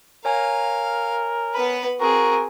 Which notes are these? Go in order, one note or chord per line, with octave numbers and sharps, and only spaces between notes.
A#4 C#5 F5 G#5 A#5
B3 B4 B5
C4 F#4 G#4 A#4